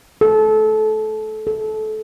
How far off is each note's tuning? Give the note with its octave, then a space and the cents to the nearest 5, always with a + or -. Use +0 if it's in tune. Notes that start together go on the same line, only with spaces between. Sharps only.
A4 -25
A4 -25